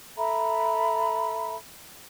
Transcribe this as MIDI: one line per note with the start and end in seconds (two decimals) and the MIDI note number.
0.17 1.56 69
0.17 1.56 76
0.17 1.56 82
0.17 1.56 83